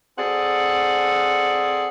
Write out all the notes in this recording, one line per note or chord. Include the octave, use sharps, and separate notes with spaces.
C4 G#4 A4 D5 F#5